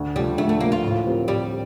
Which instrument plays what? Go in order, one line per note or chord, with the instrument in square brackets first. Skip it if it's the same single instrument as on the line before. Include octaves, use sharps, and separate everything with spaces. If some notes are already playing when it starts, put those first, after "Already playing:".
Already playing: [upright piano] D2
[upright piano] D3 F3 A3 [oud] G3
[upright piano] D2 [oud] A3
[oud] A3
[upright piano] D3 F3 A3 [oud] A#3
[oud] F4
[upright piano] A2
F3 C4 G4 A#4
[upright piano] A2 [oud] G3